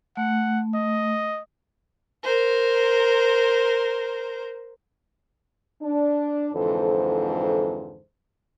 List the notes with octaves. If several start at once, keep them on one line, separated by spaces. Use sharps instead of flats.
A3 F#5
D#5
A#4 C5
D4
F2 G#2 D3 E3 A4 C5